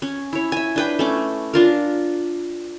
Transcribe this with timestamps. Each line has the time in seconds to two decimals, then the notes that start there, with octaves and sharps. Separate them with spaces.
0.02 C#4
0.33 E4 C#5
0.52 E5 G#5
0.76 D4 B4 G5
0.99 A3 C#4 D6
1.54 D4 F4 A#4